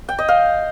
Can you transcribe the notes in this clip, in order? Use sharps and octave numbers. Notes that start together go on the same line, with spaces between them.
G5
D#5
F5